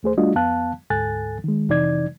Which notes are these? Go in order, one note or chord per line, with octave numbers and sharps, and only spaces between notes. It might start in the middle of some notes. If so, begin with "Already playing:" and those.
D#2 A3 G#4 C5
G3 A3 D4 F4 F#4 D#5
F2 B3 F5 A5 F#6
D2 G#2 A4 G#5 F#6 A6
D#3 G#3
F2 C3 E3 D#4 D5 G#6